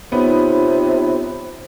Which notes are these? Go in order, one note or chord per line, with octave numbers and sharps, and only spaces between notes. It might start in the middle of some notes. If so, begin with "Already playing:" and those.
C3 B3 D#4 F4 C#5